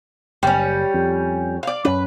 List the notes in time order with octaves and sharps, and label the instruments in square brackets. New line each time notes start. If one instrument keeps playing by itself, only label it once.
[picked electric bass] F#1 [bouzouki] G3 C#4
[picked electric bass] F2
[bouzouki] D5 F5
[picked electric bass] F#2 C#4 [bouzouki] B4